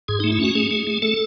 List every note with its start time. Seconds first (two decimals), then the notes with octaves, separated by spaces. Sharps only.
0.08 G#2 G#4
0.20 A3 D#4
0.32 E4
0.40 C#4 F#4
0.55 A3 G#4
0.71 A3
0.87 A3
1.02 A3 A4